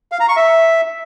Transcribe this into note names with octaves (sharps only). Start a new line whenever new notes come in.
F5
A#5
C#6
E5